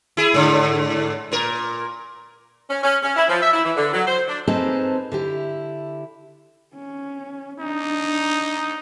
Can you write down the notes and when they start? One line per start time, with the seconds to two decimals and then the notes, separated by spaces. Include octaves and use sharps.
0.17 E4 G#4
0.34 G#2 D3
1.32 A#2 A#4
2.70 C#4
2.84 C#4
3.03 C#4
3.16 E4
3.29 F3
3.42 E5
3.53 E4
3.65 E3
3.77 D3
3.93 F#3
4.06 C5
4.28 D4
4.47 C4 D#4 G#4 A4 B4 C5
5.12 D3 E4 G4
6.75 C#4
7.60 D4 D#4